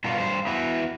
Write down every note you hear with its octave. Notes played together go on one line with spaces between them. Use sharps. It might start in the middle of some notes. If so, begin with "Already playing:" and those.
G2 B2 F4 F#4
G2 C5
B3 E4 F#4